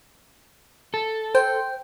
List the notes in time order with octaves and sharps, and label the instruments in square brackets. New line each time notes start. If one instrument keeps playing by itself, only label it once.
[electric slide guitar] A4
[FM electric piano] C5 [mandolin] G5